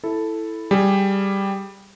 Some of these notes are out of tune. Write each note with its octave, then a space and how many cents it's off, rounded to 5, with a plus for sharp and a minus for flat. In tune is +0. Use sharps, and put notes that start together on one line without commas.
E4 +0 A4 +0
G3 +0 G#4 +0